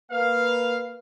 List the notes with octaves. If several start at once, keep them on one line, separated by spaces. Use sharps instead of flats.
A#3 B4 F5